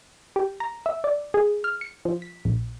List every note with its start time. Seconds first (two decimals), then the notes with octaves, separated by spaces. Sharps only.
0.36 G4
0.60 A#5
0.86 E5
1.04 D5
1.34 G#4
1.64 F6
1.81 C#7
2.05 F3
2.22 B6
2.45 A#1